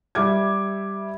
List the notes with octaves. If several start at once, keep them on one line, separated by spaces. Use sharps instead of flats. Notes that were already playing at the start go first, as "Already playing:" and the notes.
G3 E5 D6 G#6